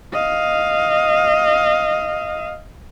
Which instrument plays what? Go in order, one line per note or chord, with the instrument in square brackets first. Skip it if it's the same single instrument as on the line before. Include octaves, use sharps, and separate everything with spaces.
[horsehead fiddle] D#5 F5